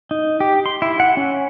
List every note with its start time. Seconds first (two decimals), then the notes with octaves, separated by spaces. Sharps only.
0.11 D#4
0.40 G4
0.66 C6
0.82 E4
1.00 F#5
1.17 C#4